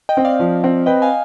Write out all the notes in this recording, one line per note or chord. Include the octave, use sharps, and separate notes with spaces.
D#5 G5
C4
D5 F5
F3
C4
B4 D#5 G5
F5 G#5